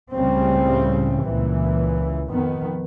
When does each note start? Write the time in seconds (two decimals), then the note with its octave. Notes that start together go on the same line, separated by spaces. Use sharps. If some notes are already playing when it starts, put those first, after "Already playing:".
0.14 C#2 A2 C#3 G3 C4
1.23 C#2 A#2 E3
2.30 F2 D#3 B3